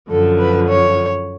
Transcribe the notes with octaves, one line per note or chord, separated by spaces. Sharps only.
F#2 D3 F3 A4
B4
C#5